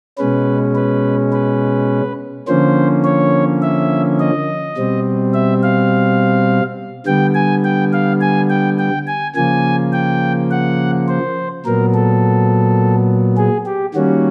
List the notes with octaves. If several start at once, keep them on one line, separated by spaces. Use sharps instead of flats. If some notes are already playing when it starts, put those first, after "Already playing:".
B2 G#3 C#4 B4
B4
B4
D3 F3 A#3 C#4 C5
C#5
E5
D#5
B2 G3 C4
E5
F5
D3 G3 B3 G5
G#5
G5
F5
G#5
G5
G5
G#5
C#3 F3 A#3 G#5
G5
F#5
C5
A#2 F#3 B3 A#4
A4
G#4
G4
D#3 G3 A#3 C#4 F#4